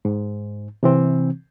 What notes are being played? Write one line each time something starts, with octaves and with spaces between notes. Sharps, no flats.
G#2
C3 E3 C4